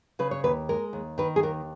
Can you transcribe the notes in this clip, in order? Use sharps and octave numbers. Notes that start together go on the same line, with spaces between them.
C#3 B4
C#5
D#2 B4
G#3 A#4
D#2
D#3 B4
G#4
D#2 A#4